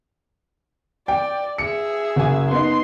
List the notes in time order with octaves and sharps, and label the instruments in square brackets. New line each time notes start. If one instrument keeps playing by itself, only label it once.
[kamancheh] D5 [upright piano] G5
[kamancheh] G#4 E5 [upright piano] C#7
[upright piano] F#1 G#5
[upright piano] B3 D#4 [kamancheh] C6